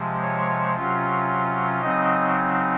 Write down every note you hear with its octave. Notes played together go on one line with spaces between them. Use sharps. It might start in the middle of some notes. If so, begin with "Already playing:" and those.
Already playing: C3 F3 G#3
C#5
C3 F#3 C#4 F4
C#3 F#3 C4 D#4 D#5